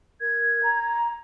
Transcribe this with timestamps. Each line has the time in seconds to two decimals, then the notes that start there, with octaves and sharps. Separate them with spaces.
0.21 A#4 G#6
0.63 A#5